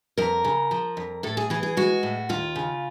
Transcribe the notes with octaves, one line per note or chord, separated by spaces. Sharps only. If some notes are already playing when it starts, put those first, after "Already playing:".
F2 A#4
C#3
F3
F2
A2 A4
G#4
E3 G#4
G#4
G#3 F#4
A2
D#2 F4
C#3